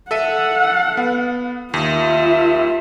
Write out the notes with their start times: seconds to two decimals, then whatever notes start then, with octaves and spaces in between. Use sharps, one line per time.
0.11 A4 E5 F#5 D#7
0.97 B3
1.74 D#2 F4 E5